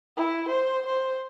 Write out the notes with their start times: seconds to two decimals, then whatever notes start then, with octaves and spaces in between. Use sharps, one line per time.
0.17 E4
0.48 C5
0.86 C5